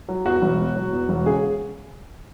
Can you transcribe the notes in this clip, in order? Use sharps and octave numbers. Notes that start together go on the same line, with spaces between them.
F#3
E2 F#4
E1
B2
F#3
E2
E1
C#3 G#4